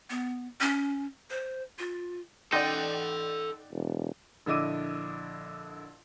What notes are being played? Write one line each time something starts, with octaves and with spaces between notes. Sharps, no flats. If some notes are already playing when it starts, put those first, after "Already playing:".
B3
C#4
C5
F4
D#4 A4 D5 F#5 G5 C6
E1
A#1 D3 E4 D#5 D6 D#7